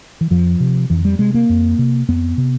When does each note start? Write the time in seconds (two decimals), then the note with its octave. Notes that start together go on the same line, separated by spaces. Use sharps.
0.21 E3
0.31 F2 F3
0.60 C3
0.90 F2 E3
1.05 G3
1.19 C3 G#3
1.34 A#3
1.49 F2
1.79 C3
2.08 F2 B3
2.38 C3